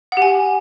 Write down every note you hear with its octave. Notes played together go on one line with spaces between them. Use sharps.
G4 F#5 G#5